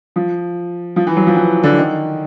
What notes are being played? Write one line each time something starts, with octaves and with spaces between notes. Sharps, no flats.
F3
F3
E3
F#3
F3
E3
D3
D#3